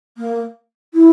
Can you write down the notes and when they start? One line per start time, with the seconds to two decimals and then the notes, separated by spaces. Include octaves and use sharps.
0.18 A#3
0.94 E4